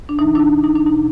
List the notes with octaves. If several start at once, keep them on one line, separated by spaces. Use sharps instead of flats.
D4
C3 E3 D#4
D4 E4
D#4
D4
B2 D#4